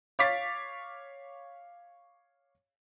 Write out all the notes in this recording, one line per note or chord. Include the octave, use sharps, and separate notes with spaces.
C#5 F5 D6 A6 B6